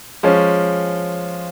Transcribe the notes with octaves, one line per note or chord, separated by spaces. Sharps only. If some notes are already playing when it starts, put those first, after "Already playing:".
F3 G#3 C#4